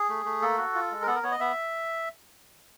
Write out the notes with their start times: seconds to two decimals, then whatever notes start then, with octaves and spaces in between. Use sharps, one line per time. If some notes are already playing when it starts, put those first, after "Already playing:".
Already playing: G#4
0.09 A3
0.25 A3
0.42 A#3 A4
0.58 F#4
0.74 F4
0.91 G#3
1.02 A#4
1.07 B3 A4
1.15 A#4
1.23 B3 C#5
1.31 D#5
1.40 B3 E5